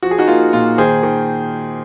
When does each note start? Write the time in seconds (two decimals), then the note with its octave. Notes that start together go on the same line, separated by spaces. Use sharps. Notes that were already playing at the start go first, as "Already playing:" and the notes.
0.03 F3 F#4
0.11 G#4
0.18 D#4 F#4
0.28 A#3 F4
0.53 A#2 F4
0.78 D#3 G#4 C5
1.03 D#3